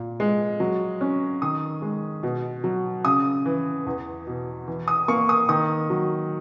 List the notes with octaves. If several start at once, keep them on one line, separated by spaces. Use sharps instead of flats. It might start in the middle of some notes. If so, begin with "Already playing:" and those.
Already playing: A#2
G#3
F#3
C#4
D#3 D#6
G#3
B2
F#3
C#3 D#6
E3
E2
B2
E3
D#6
A#3 C#6
D#6
D#3 D#6
F#3